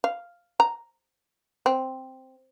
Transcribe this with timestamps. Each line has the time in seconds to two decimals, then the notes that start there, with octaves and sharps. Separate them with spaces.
0.04 F5
0.60 A#5
1.66 C4